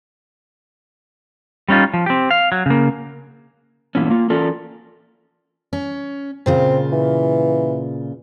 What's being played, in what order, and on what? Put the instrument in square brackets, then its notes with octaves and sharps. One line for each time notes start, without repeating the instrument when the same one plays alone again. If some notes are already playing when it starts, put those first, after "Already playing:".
[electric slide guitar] G3 C#4 D#4 F4
F3
C4 G4
F5
F#3
C#3 A#3
G2 A#2 E3 B3 C#4
A#3 F4
E3 C#4 F4 A4 A#4 D5
[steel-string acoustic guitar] C#4
[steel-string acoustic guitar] A#2 C#3 F4 [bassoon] C4
[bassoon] E3